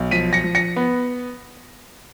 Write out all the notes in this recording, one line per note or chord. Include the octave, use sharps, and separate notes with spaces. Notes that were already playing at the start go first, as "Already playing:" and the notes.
Already playing: B1
F3 B6 D#7
A#6 C#7
F3
A#6 C#7
B3